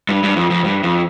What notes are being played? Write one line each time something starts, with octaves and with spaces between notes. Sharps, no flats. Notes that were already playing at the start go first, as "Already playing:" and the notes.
G2
G2
F2
F2
G2
F2